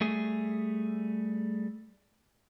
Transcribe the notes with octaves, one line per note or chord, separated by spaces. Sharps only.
G3 A3 G#4